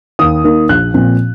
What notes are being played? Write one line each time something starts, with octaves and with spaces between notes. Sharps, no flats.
D#2 D#6
D#3 A#3
A#1 F#6
A#2 F3 C4